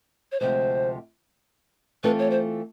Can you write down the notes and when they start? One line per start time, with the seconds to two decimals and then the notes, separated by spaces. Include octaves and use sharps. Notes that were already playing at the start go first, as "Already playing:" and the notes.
0.32 C#5
0.40 D2 C3 F3 G#3 C5
2.03 E3 A3 C4 F4 A4 B4
2.19 C#5
2.30 C5